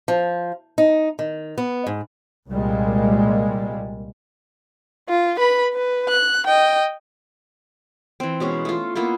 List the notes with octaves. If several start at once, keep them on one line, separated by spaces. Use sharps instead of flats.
F3
D#4
D#3
B3
G#2
C2 A#2 G3 G#3
F4
B4 B5
B4
F#6
D#5 G5
E3 C4
B2 G#3 C#4
A3 F4
A#3 B3 E4 F4